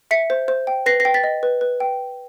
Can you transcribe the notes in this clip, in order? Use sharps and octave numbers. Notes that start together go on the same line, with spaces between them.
E5 B6 C#7
C5
C5
G5
B4 A#6 C7
A#6 C7
G5
A6 B6
D#5
B4
B4
G5